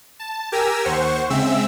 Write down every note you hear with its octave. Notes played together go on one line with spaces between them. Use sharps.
A5
G4 A#4 G#5 A#5 E6
D#2 C5 F#5 C#6
C#3 G#3 C4 E5 E6